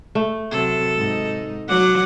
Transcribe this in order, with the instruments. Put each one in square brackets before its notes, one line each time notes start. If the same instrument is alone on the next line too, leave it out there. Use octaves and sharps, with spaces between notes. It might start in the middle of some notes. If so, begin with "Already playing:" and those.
[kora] A3
[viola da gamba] C3 F#3 [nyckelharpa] A4
[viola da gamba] G#2 D#4
[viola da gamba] F#3 [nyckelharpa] F#5 D6